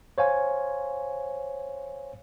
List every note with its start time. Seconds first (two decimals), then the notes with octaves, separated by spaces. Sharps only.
0.18 C5 C#5 F5 G#5